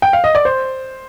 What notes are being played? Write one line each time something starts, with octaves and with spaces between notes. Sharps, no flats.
G5
F5
D#5
D5
C5